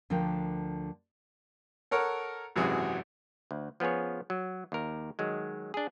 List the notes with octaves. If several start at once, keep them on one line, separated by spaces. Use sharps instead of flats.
D2 D3 F3 A#4 G5
A4 A#4 C#5 F#5
G#1 F#2 C3 E3 F#4 G#4
D2
F3 B3 C#4 G#4 C#5
F#3
D#2 A#4
D#3 F#3 G#3
D4 G#4